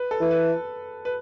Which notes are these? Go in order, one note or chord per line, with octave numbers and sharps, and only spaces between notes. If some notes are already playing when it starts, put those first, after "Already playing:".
Already playing: B4
A4
E3
B4
B4